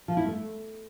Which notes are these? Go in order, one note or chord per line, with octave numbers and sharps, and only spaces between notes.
F3
E4
A3